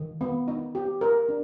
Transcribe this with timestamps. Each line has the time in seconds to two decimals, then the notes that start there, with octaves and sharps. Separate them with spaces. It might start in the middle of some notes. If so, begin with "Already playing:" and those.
Already playing: D#3
0.21 B3
0.48 D#4
0.75 G4
1.01 A#4
1.29 D4